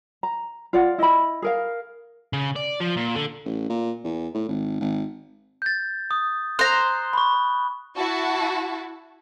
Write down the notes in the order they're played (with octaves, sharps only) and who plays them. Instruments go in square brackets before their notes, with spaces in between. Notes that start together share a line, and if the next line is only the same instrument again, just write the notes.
[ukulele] A#5
F4 D5 F#5
E4 D#5 E5 B5
G#4 A#4 F5
[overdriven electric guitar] C#3
D5
F3
A#2
D3
[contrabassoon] A1
A#2
E2
A2
G#1
G#1
[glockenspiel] G6 A6
D#6
[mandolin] C5 A#5 [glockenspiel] F#6
[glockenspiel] B5 C#6
[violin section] E4 F#4 A5